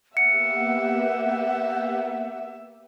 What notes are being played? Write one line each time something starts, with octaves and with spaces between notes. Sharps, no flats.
A#3 B3 G4 E5 F#5 C#7